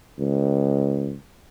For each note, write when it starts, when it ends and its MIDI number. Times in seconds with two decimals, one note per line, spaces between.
0.19 1.15 37